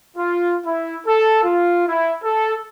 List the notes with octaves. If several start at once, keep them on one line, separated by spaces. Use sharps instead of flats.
F4
E4
A4
F4
E4
A4